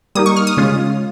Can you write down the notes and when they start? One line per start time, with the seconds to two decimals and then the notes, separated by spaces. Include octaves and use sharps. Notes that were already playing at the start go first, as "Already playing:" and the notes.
0.15 G3 A#3 D#4 D#6
0.26 C#6
0.36 F6
0.47 D#6
0.57 C#3 G#3 C#4 F4